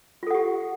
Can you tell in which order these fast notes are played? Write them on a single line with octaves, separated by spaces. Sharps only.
F4 A4 F#5 G4